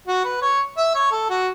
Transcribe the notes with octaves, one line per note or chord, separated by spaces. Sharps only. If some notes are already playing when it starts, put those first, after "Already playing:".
F#4
B4
C#5
E5
C#5
A4
F#4